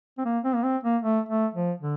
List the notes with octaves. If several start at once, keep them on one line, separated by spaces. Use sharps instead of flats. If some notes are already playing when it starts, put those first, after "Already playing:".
C4
A#3
C4
A#3
C4
A#3
A3
A3
F3
D3